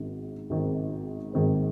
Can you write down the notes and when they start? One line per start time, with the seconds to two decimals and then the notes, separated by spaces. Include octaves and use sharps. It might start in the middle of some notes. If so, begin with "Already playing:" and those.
Already playing: G#1 G#2 D#3 C4
0.50 G#1 G#2 D#3 C4
1.33 G#1 G#2 D#3 C4